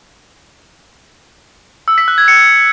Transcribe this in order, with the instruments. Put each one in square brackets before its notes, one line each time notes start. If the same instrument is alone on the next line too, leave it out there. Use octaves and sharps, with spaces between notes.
[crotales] E6
B6
F#6
G#6
C#7